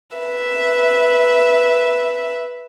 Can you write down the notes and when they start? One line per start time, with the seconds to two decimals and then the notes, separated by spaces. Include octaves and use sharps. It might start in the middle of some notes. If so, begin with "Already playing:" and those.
0.16 B4 E5